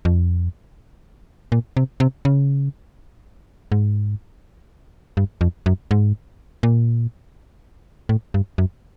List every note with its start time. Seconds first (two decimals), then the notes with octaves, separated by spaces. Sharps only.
0.05 F2
1.52 A#2
1.77 C3
2.00 C3
2.25 C#3
3.72 G#2
5.17 G2
5.41 F2
5.66 F#2
5.91 G#2
6.63 A#2
8.09 A2
8.34 G2
8.58 F#2